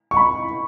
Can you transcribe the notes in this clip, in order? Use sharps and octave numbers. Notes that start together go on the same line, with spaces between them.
C#6
B5